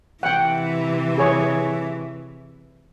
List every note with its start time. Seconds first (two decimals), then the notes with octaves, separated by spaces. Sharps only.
0.23 C3 E3 F#5 G5
1.18 G#4 C#5